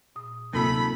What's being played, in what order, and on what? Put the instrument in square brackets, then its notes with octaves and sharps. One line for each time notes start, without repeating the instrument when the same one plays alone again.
[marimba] A#2 D#6
[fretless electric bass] D1 C3 [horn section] D#3 A4 B5 [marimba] A#3 F4